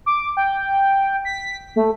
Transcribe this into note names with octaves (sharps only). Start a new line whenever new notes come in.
D6
G5
B6
A3